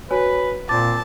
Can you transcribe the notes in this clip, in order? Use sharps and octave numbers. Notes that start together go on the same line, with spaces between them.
F#4 B4 C#5 G#5
A#2 C4 A5 D6 A6